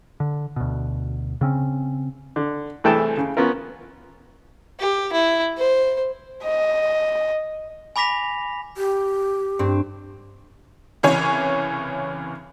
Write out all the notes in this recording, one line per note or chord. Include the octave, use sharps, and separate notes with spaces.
D3
D2 B2
C#3 C4 C#4
D3
C2 E3 A3 G#4 G5 A5
C#3
B3 C#4 F4 A#4
G4
E4
C5
D#5
G#5 B5 D6 A#6 B6 F7
G4
G2 C4
C2 C#3 E3 C#5 G#5